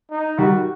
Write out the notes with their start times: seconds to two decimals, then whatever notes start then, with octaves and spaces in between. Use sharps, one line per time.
0.11 D#4
0.38 D#3 G3 F#4